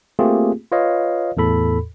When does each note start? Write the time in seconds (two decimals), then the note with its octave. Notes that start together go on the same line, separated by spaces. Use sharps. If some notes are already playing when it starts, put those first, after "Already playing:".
0.19 A3 A#3 C4 F4 G4 G#4
0.72 F4 B4 C#5 D#5 F5
1.37 E2 A2 A4 B5